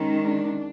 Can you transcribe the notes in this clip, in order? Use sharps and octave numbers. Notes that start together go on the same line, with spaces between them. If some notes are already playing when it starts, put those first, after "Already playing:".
Already playing: D#3 G#3 C#4
D4